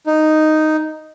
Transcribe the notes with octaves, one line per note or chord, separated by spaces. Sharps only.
D#4